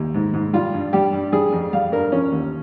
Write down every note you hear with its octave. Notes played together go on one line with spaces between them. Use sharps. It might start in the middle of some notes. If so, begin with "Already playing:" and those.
Already playing: D#2
G#2
G#2
G3 F4
G2
G3 G4
G2
G3 G#4
F2
G3 F5
G2 A#4
F3 C#4
D#2